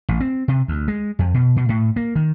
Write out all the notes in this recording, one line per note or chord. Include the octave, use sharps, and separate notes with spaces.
A1
C4
C3
D2
G#3
F2
B2
B2
A2
A#3
D#3